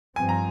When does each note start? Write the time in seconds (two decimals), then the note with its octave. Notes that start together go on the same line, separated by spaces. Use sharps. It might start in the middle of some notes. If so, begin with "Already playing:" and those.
0.16 G2 F3 C4 G#5
0.29 A#5